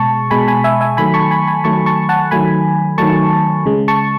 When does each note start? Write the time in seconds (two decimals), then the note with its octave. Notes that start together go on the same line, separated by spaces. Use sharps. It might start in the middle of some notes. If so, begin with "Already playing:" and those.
Already playing: B2 G#3 A5 C#6
0.30 B2 G#3 G#5 B5
0.48 G#5 B5
0.64 E5 G#5
0.81 E5 G#5
0.97 D#3 F#3 A3 G#5 B5
1.14 A5 C#6
1.31 G#5 B5
1.47 G#5 B5
1.64 D#3 F#3 A3 A5 C#6
1.86 A5 C#6
2.09 F#5 A5
2.31 D#3 F#3 A3 G#5 B5
2.98 D#3 F#3 A3 A5 C#6
3.66 C#3 G#3
3.88 A5 C#6